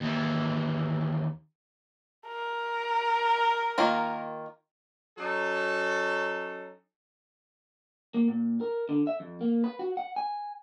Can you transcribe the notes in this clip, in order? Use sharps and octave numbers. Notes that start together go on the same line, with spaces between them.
D#2 E3
A#4
D#3 A#3 F4
F#3 C#4 D#4 A4
A#3
A#2
A#4
D3
E5
F2
A#3
B4
F#4
F#5
G#5